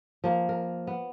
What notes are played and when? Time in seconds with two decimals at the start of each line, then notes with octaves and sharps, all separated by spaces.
0.24 F3 A#3
0.49 A#4
0.87 B3